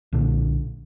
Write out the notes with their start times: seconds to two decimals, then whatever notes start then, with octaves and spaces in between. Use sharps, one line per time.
0.13 B1 A#2 D3